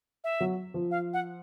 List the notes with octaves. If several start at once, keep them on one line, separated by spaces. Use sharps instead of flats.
E5
F#3
F3
F5
F#5